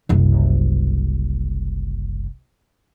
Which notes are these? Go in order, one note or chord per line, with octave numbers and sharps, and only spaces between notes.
F#1 C2